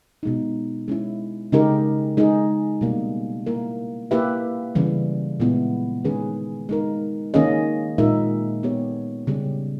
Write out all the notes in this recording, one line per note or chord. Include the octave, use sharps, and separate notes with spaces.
B2 G#3 D#4
G#3 C#4 E4
C#3 G#3 D#4 G4 A#4
G#3 D#4 G#4
B2 G3 A#3
A#3 E4 A#4
A#3 E4 G4 B4 E5
C#3 E3 G3
A#2 G#3 B3 E4
D#3 G#3 C#4 G#4 B4
G#3 D#4 A#4
D#3 A#3 C#4 G#4 D#5
A#2 G#3 D#4 A#4 E5
B3 G4 C#5
C#3 G3 C#4 G4